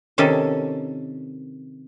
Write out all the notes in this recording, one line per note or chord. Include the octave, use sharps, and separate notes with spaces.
C3 D#3 C#4 A4